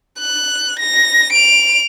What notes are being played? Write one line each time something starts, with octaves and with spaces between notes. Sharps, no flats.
F#6
A#6
D7 F7